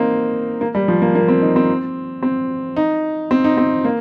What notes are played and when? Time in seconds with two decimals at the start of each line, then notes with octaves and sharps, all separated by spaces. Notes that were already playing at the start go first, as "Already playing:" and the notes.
Already playing: A#3 C4 D#4
0.61 A#3
0.75 G3
0.88 F3
1.02 A#3
1.15 A#3
1.28 C4
1.42 D#4
1.56 C4
2.23 C4
2.76 D#4
3.31 C4
3.44 D#4
3.57 C4
3.85 A#3